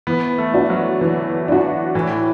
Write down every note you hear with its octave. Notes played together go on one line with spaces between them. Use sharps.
E3 B3
A3
D4 F#4
F#3
E3
D4 F#4
A2 E3